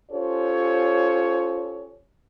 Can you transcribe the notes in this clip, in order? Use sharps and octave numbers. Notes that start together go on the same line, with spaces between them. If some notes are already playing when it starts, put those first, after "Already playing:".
C#4 F4 G4 A4 C5 C#5